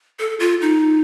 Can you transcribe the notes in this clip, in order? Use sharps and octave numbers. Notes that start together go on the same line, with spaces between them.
A4
F4
D#4